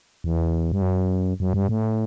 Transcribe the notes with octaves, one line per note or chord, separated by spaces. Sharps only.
E2
G2
F#2
F#2
G2
A2